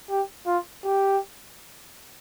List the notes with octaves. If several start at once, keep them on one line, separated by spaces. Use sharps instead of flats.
G4
F4
G4